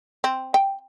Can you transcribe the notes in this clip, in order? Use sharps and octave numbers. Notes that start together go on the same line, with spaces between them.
C4
G5